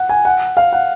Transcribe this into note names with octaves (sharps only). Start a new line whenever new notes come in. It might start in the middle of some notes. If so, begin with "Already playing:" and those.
Already playing: F#5
G#5
F#5
F5
F#5